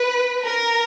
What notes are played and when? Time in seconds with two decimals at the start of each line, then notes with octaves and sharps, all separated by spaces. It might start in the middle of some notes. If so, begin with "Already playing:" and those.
Already playing: B4
0.43 A#4